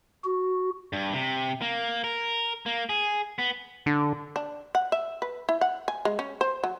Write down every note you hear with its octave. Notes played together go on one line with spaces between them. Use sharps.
F#4
G2
C3
A#3
A#4
A#3
G#4
B3
D3
D4
F#5
E5
B4
E4
F#5
G#5
G#3
C#4
C5
F#3